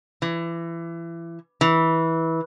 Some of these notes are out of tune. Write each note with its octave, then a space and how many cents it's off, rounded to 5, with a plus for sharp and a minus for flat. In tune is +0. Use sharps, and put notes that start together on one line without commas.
E3 +25
E3 -15